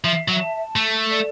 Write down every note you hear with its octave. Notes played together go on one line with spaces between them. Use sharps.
F3 E5
F#3
A5
A3 A4
D5